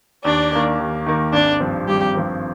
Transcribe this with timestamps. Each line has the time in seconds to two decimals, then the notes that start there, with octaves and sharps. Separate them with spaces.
0.24 D#2 D4 D5
0.52 D#3 A#3
0.79 D#2
1.06 D#3 A#3
1.33 G#1 D4 D5
1.60 G2 F3 C4
1.87 G#1 G3 G4
2.15 G2 F3 C4